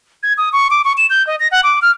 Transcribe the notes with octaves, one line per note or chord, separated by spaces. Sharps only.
G#6
D#6
C#6
D6
C#6
E7
G6
D#5
A#6
F#5
D6
F6